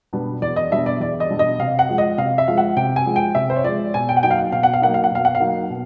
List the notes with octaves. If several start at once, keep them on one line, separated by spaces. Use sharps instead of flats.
B2 G3 B3 D4
E2 D5
D#5
B2 G3 B3 D4 E5
D5
E2 D5
D#5
B2 G3 B3 D4
D#5
C3 F5
F#5
F3 G#3
D#5
C3 F5
E5
F3 G#3 F5
F#5
C3 G5
G#5
F3 G#3
G5
C3 E5
C5
C#5
F3 G#3 D5
B2 G#5
G5
F#5
F#3 A#3 D#4 G5
F5
F#5
B2 F5
F#5
F5
F#3 A#3 D#4 F#5
F5
F#5
B2 F5
F#5
F5
F#3 A#3 D#4
B2